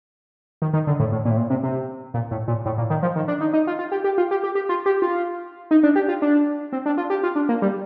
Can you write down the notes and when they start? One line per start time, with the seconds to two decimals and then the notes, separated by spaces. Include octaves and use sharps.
0.62 D#3
0.73 D#3
0.87 D3
1.00 A2
1.12 A2
1.25 A#2
1.31 A2
1.37 A#2
1.50 C3
1.63 C3
2.14 A#2
2.31 A2
2.48 A#2
2.65 A2
2.78 A#2
2.90 D#3
3.02 F3
3.16 D#3
3.28 D4
3.41 D#4
3.53 D#4
3.67 F4
3.79 F4
3.92 G4
4.04 G4
4.18 F4
4.31 G4
4.44 G4
4.55 G4
4.69 F4
4.86 G4
5.02 F4
5.71 D#4
5.83 D4
5.96 G4
6.08 F4
6.22 D4
6.72 C4
6.86 D4
6.98 F4
7.10 G4
7.23 F4
7.36 D4
7.49 A#3
7.62 G3